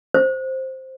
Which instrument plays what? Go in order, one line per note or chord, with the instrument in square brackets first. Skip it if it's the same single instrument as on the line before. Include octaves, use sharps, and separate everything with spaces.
[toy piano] C5